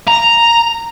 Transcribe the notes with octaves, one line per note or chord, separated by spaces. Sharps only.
A#5